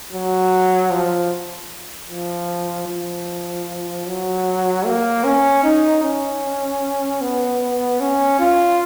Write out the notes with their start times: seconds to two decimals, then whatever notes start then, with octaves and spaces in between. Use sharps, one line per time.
0.12 F#3
0.91 F3
2.09 F3
2.88 F3
4.07 F#3
4.85 A#3
5.24 C#4
5.63 D#4
6.03 C#4
7.21 B3
8.00 C#4
8.39 F4